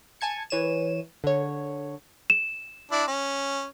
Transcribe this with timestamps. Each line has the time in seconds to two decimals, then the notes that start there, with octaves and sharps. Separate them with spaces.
0.21 G#5 A5 G#6 C#7
0.50 E3 C#5 D#7 E7
1.24 D3 C#5
2.30 E7
2.91 D4 E4 D5
3.08 C#4